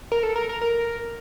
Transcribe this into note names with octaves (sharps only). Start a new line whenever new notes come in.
A#4
A4
A#4
A#4
A#4